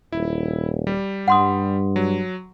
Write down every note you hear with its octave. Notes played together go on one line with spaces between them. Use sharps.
D#1 E4
G3
G2 F#5 C6 D#6
F#3